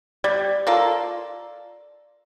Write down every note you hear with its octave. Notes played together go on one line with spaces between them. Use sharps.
G3 D5
A#3 F4 A4